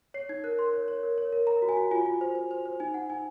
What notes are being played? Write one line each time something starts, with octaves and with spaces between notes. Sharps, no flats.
C#5 C7
D#4 G#6
A#4 F#6
A#4 C6
C#5
C#5
A#4
C#5
A#4
A#4 A#5
F#4
G#5
F#4
F4 G#5
F4
C5
C5
C5
C5
D#4 G#5
D#4 F#5
D#4 G#5